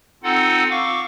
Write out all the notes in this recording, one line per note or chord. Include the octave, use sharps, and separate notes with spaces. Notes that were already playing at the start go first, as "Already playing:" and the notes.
C4 D#4 F4 A4 F#5
F5 C#6 D6